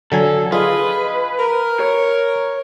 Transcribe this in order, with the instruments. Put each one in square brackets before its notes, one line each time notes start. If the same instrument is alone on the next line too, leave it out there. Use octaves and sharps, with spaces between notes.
[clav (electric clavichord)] D3 F#3 G#5 [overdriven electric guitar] A4
[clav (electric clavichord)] F4 [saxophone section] G#4 D#5 [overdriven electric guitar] B4
[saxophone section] A#4
[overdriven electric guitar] C#5